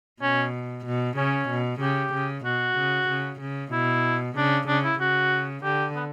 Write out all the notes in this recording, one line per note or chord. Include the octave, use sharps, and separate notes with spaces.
B2 C#4
B2
C#3 C#4
B2
C#3 G4
C#3
B2 F#4
C#3
C#3
C#3
B2 E4
C#3 D4
C#3 D4
E4
C#3 F#4
D3 G4
B3